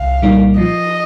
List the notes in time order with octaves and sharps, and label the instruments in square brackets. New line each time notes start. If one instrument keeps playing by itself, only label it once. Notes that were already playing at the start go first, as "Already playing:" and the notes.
Already playing: [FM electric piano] C2 [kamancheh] F5
[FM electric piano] A#2 G3 A#3 D#4
[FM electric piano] F3 [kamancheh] D#5